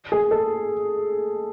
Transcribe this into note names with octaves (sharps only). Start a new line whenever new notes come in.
G#4
A4